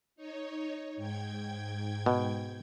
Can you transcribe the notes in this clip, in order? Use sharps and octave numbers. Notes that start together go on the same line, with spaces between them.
D#4 C#5
G#2 G5 G#6
B2